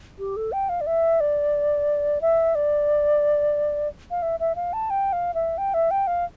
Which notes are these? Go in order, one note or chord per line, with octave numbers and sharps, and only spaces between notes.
G4
A4
G5
F5
D5
E5
D5
E5
D5
F5
E5
E5
F5
A5
G5
F5
E5
G5
E5
G5
F5